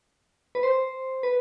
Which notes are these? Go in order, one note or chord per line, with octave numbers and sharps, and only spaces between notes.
B4
C5
B4